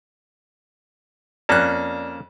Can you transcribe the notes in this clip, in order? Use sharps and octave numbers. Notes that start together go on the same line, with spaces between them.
F2 A#3 C#4 D5 F#6